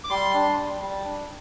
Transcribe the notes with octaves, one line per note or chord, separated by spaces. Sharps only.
D6
G3 C6
D4
G3
G3
D4